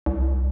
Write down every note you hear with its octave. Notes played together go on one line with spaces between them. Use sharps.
C2